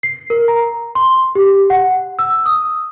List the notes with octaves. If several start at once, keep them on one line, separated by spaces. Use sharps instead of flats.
C7
A#4
A#5
C6
G4
F#5
E6
D#6